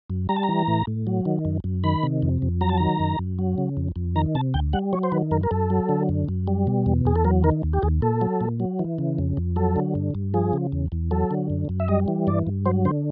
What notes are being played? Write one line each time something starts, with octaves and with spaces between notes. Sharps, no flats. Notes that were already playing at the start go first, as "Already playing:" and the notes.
F#2
G3 A#5
A5
A#5
E3
A2
A2
F#3
D#3
F#2
F#2
D#3 B5
C3
F2
F2
F#3 A#5
A5
D#3 A#5
F#2
F#2
F#3
C#3
F2
F2
D#3 A#5
C3 A5
D2 G5
G3 F#5
F#3 C#5
C5
D#3 B4
F#2 A#4
A#4
F#2 A4
F#3
D3
F#2
F#2
G3
B2
E2
E2 G#4
A4
F#3 A#4
D#3 A#4
D#2
G4
D#2 G#4
A#2 A4
F#3
A#2
F#3
E3
C#3
F2
F2
F#3 A4
D3
G2
G2
F3 G#4
C#3
E2
E2
F#3 A4
D3
F#2
F#2
E5
G3 D#5
E3
G2 D5
G2
F#3 C5
D3 C5